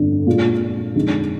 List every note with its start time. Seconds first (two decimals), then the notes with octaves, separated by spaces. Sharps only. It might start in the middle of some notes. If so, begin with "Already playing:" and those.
Already playing: G1 F2 D3
0.27 A#2 G#3 D4 F4
0.95 F2 D3 G#3 D#4